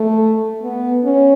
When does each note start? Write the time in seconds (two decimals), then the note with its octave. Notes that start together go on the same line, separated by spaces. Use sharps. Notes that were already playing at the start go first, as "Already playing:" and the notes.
Already playing: A3
0.63 B3
1.05 C#4